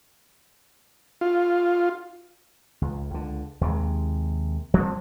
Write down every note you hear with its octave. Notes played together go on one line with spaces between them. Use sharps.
F4
C#2
C#2 D3
D#2 C3 G#3
F3 G3 B3 C4